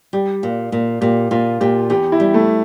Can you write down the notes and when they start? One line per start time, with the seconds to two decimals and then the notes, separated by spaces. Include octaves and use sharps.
0.13 G3 G4
0.43 A#2
0.72 A#2
1.01 A#2 G4
1.31 A#2 F4
1.61 A#2 G4
1.90 E2 G4
2.12 E4
2.20 G3
2.34 A3